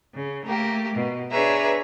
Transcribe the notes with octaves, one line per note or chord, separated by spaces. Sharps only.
C#3
A3 A#3 G4
B2
D4 G#4 B4 C#5 E5 A#5